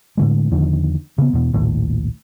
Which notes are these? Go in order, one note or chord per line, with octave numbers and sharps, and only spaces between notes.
A2 D3 G#3
E2 D3 D#3 F3
C#3 B3
E2 B2
A#1 D#2 A2